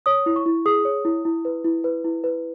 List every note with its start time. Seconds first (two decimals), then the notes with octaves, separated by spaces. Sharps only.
0.06 C#5 D#6
0.26 E4
0.36 C#6
0.46 E4
0.66 G#4 D#6
0.85 C#5
1.05 E4
1.25 E4
1.45 B4
1.64 E4
1.84 B4
2.04 E4
2.24 B4